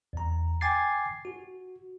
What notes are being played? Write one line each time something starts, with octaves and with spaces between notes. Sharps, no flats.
E2 A#5
G5 G#5 D6 G#6 A6 C7
F#4